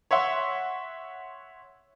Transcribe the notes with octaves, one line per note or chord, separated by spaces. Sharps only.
C#5 E5 F#5 C6